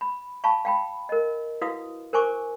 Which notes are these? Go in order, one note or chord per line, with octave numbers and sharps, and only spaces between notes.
B5
F5 A5 B5 C#6
F5 G5 B5
A#4 D#5
E4 F#4 B4 F5 D#6
A#4 C5 G#5 C#6 D6